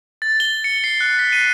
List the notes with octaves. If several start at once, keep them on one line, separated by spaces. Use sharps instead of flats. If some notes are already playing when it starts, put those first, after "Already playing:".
A6
G7
C#7
C7
F#6
B6
D#7